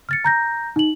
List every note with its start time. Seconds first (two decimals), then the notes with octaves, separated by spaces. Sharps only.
0.09 F6 A6 C#7
0.25 A#5 G6 A#6
0.76 D#4 F#7